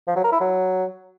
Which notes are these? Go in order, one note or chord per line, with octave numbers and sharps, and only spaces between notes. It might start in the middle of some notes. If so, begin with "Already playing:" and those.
F3
F#3
A#4
E4
F#3